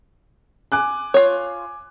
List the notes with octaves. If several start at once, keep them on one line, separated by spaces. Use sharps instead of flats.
G#5 D6 F#6
F4 C#5